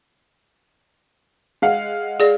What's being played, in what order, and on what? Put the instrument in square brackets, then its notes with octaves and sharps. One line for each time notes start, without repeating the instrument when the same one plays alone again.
[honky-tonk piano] G#3 F5 F#5
[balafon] G#4 D5